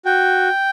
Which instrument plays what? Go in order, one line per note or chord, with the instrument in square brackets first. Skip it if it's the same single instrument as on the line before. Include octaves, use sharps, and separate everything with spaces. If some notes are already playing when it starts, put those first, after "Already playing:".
[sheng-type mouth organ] F#4 G5